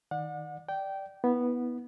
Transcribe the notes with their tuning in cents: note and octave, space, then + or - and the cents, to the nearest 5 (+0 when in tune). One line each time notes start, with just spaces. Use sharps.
D#3 +5 D5 +20 F#5 -35
D5 +0 G5 -15
B3 -10 E4 -40